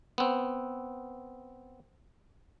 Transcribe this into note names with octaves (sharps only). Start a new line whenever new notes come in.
B3 C4